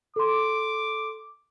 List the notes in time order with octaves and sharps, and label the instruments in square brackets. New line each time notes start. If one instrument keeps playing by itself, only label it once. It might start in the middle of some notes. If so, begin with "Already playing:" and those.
[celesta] A4 C6 [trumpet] D6